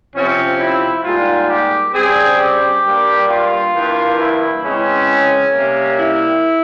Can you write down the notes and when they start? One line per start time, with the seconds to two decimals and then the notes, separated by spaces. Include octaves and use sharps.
0.14 C3 F3 C4 C#4
0.60 E4
1.04 G#2 G3 A#3 F4
1.49 G4
1.94 C#3 G3 C4 G#4
2.39 G4
2.84 G2 G3 A#3
3.29 F4
3.74 G2 E3 A#3
4.19 E4
4.63 C#3 E3 G#3 C4 C#4
5.53 C3 G3 A#3
5.99 E4